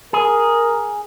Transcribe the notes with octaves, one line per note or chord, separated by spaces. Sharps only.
G#4 A#4